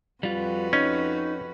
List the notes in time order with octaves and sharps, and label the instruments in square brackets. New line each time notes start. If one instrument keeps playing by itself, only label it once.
[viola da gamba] F2 F#4 B4 [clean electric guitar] G3 F4
[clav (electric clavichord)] C#4 [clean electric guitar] D#4